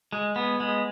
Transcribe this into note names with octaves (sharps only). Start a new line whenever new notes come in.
G#3
B3
G#3